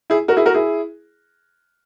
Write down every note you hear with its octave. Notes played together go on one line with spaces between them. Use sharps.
E4 G#4
F#4 A#4
E4 G#4
F#4 A#4
E4 G#4